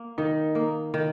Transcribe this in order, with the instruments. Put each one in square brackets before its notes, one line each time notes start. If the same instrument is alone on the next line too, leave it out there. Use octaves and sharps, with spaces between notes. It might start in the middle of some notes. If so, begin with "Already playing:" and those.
Already playing: [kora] A#3
[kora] D#3 [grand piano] D#4
[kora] A#3
D#3